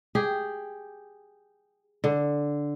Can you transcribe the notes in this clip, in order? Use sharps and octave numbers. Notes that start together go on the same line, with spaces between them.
G4 G#4
D3